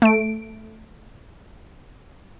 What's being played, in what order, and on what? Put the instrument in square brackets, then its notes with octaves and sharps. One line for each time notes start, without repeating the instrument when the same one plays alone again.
[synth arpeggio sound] A3 D7